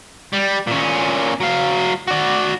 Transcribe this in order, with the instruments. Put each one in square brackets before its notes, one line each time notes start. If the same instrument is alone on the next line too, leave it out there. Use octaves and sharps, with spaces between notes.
[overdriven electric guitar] G3
A#2 C#4
F#3 F5
F#4 D5